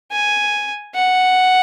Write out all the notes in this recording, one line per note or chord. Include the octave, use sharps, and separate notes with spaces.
G#5
F#5